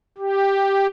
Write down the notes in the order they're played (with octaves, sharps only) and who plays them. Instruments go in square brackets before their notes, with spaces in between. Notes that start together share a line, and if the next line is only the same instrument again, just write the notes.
[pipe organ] G4